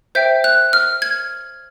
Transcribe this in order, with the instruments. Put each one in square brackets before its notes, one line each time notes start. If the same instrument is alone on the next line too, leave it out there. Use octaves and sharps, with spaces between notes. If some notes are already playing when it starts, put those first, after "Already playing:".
[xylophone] C5 E5 G5 G6
F#6
F6
G#6